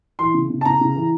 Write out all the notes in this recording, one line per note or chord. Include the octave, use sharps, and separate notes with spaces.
E3 C6
C#3
C#3
A5
C#3 A#5
C#3
E3